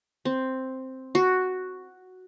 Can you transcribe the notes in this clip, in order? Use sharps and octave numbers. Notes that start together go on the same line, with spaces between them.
C4
F#4